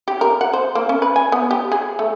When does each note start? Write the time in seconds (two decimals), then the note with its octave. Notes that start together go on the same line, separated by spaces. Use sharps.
0.08 G4
0.21 A#4
0.41 F#5
0.53 C5
0.75 A#3
0.89 C#4
1.02 B4
1.16 G#5
1.32 B3
1.51 G4
1.72 G#4
1.99 A3